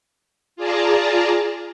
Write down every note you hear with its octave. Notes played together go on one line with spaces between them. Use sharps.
F4 G#4 D5 A5 A#5